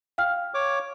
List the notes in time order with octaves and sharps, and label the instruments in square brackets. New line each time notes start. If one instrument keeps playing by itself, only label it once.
[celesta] F5 G5 F6
[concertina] C#5 D6